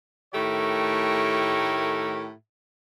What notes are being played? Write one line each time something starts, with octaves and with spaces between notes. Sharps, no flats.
A2 D#3 A3 G4 A#4 C#5